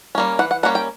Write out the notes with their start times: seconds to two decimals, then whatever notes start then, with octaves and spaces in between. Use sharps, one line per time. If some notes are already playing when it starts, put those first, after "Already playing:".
0.15 G3 A#3 C#4
0.39 E3 F#5
0.51 F#5
0.63 G3 A#3 C#4 F#5
0.75 G5